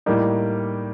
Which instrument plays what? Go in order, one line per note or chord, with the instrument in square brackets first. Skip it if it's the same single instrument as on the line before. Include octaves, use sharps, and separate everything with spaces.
[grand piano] A2 G3 A#3 D#4